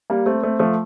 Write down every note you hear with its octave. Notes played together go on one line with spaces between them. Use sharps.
G3 A#3
A3 C4
A3 C4
F3 A3